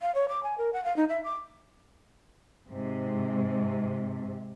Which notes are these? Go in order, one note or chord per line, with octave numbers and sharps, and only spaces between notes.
F5
C#5
D6
G#5
A#4
F#5
F5
D#4
E5
D6
G#2 C3